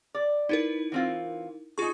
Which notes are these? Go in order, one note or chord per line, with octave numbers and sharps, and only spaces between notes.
D5
D#4 E4 A#4 B4
E3 C4 F4
D#4 F4 G#4 C#6